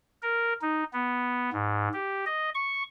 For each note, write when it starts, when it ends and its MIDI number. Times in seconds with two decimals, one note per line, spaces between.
0.22 0.53 70
0.62 0.84 63
0.93 1.50 59
1.53 1.88 44
1.93 2.25 67
2.26 2.50 75
2.55 2.83 85